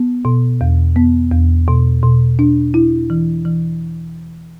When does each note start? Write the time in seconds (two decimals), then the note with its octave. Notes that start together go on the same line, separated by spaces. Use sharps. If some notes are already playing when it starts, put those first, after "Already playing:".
Already playing: B3
0.25 B2
0.61 E2
0.96 B3
1.31 E2
1.68 B2
2.03 B2
2.39 D4
2.74 E4
3.10 E3
3.45 E3